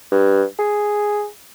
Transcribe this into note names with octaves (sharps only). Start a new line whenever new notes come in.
G2
G#4